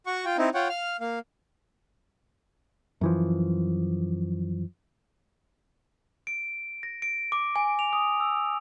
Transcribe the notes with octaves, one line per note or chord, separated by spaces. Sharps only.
F#4 F#5 C#6
F4 G5
C4 D#4 E4
F4 C#5 F#5 G5
F5 F6
A#3 F5
F#2 E3 F3
D7
A#6
D7
D6
G#5
F7
D#6
E6